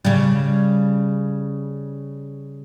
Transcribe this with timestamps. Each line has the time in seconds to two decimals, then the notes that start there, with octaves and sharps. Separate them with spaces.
0.05 C#3 G3